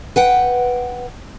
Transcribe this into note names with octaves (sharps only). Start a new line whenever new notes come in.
B4 F#5 G5